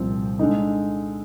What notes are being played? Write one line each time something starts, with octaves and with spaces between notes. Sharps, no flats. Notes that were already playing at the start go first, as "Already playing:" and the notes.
Already playing: C2 A#2 F3 C4
D3 G#3 D#4